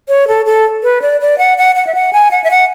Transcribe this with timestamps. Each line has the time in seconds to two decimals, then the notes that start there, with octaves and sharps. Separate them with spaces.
0.08 C#5
0.28 A4
0.46 A4
0.83 B4
1.02 D5
1.21 D5
1.38 F#5
1.58 F#5
1.76 F#5
1.87 E5
1.95 F#5
2.13 G#5
2.31 F#5
2.44 E5
2.51 F#5